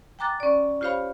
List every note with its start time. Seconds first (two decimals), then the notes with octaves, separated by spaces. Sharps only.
0.19 G5 G#5 A#5 D6 F#6 A6
0.40 C#4 D5
0.81 F4 G4 C5 C#5 F5 B5